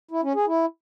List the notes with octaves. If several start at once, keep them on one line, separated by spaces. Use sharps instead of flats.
E4
C#4
G#4
E4